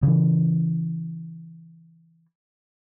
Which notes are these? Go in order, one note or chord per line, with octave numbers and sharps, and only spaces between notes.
C#3 E3